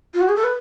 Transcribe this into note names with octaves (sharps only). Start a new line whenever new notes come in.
F4
F#4
G#4
A4
B4